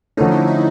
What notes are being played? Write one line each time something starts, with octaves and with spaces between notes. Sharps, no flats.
D3 F3 A3 C#4 D#4
E4
E4